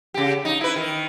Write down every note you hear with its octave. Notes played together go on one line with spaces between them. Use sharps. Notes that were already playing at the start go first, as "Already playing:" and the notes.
C#3 G4
D#4
E4 B4
D#3